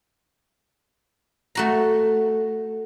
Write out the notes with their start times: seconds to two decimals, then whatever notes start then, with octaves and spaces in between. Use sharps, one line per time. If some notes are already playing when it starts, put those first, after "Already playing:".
1.55 A3 F#4 A#5